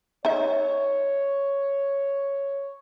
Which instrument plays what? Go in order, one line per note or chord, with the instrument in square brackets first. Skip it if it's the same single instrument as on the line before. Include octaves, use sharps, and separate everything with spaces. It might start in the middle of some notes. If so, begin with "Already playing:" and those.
[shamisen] D#4 E5 [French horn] C#5